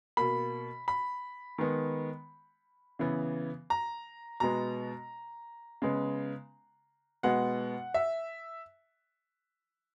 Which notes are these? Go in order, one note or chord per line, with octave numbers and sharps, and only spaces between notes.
B2 A#3 B5
B5
D#3 G#3 B3
C#3 E3 B3
A#5
B2 G#3 B3 A#5
C#3 G#3 B3
B2 G#3 B3 F#5
E5